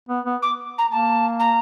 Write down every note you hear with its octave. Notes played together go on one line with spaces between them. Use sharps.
B3
B3
D6
A#5
A#3 A5
A#5